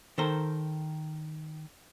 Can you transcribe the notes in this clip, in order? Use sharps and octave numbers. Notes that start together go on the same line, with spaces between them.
D#3 A4 A#4 C5